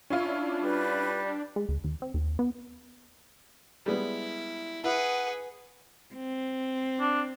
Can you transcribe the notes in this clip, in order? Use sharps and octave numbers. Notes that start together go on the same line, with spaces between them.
C#4 D4 E4 F4
G3 B4
G#3
D2
D#2
C4
D#2
B3
G3 G#3 B3 E4
E4 G#4 B4 F#5
C4
D4